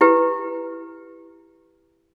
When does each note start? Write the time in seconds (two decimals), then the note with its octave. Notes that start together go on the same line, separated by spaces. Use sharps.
0.01 E4 G4 B4